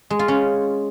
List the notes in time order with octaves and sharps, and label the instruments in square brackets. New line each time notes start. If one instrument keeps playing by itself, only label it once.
[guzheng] G#3
F4
C#4